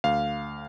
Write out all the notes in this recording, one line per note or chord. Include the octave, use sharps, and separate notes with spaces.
D2 F5